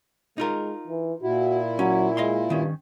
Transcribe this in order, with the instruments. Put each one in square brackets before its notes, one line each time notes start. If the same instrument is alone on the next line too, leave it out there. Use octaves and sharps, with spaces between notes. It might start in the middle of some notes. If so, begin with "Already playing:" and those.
[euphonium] G#3 [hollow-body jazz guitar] D#4 F4 A#4
[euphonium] E3
[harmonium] A#2 E4 [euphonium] F#4
[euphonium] F#3 [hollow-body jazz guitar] C#4
[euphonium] G#3 [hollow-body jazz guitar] D#5 F5 C6
[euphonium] G2 [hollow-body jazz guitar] D#3 C#4